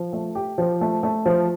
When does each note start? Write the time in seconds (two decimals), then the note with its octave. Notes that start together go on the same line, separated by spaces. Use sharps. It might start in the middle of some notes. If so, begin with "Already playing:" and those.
Already playing: F3
0.13 A3
0.35 G4
0.58 F3
0.81 A3
1.03 A3
1.26 F3